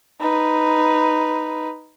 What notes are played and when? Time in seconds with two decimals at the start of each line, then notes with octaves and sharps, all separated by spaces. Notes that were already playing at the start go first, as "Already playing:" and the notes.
0.21 D#4 B4